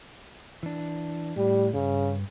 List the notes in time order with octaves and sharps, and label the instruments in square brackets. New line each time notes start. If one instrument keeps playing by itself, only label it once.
[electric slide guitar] E3 D4
[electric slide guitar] A2 [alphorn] G3
[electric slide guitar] G2 [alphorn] C#3